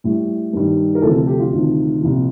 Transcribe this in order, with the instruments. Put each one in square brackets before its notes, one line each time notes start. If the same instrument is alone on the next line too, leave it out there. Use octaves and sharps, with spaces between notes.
[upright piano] A2 G3
G2 D#3 G3
A#4
D2 C3 F3 A4
A4
G4
F4
D2 C3 D#3
C2 A#2 F3